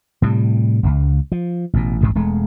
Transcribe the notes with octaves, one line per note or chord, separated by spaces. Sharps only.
A2 C3 G3
E1 C#2
F3
A1 B2
A1 D2 G#2
E1 G#3 A3